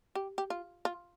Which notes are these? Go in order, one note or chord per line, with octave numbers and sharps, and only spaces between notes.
G4
G4
F4
F4